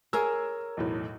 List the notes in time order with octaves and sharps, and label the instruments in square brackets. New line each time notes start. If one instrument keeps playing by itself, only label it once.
[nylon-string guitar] G#4 A#4 C#5 [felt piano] E6 G#6
[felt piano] B1 E2 A2